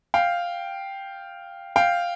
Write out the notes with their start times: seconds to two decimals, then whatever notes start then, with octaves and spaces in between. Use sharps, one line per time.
0.14 F5 G5
1.76 F5 G5